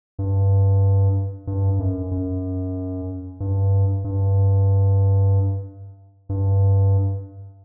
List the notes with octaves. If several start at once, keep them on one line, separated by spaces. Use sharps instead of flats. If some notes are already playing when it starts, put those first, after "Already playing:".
G2
G2
F#2
F#2
G2
G2
G2